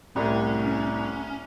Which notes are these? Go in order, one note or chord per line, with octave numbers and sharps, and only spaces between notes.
C2 A2 C#4